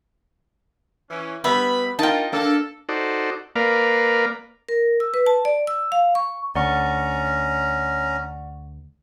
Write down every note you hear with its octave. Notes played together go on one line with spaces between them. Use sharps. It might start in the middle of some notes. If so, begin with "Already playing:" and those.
E3 C#4
G3 B3 B4 E5 B5
A#3 D#4 F4 G5 A5
A#3 D4 A4
D#4 F#4 A4 C5 D5
A#3 A#4 B4 D5 F5
A#4
E6
B4
A5
D5
E6
F5
C#6
D2 C#4 D5 F#5 A#5 C#6